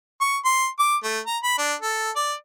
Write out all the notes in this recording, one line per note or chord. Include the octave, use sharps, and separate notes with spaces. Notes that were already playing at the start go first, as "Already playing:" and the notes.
C#6
C6
D6
A3
A#5
B5
D4
A4
D5